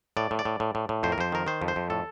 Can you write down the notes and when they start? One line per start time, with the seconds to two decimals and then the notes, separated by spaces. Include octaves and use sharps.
0.17 A2 D5
0.31 A2
0.39 D5
0.45 A2
0.60 A2
0.75 A2
0.89 A2
1.03 F2 C5
1.12 A#4
1.18 F2 C5
1.32 D#3 A#4
1.47 D#3 C5
1.61 F2
1.68 C5
1.76 F2
1.90 A2 A4